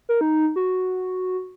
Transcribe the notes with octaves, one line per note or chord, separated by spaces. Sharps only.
A#4
D#4
F#4